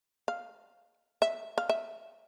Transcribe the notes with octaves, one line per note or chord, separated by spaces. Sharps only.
F5
E5
F5
E5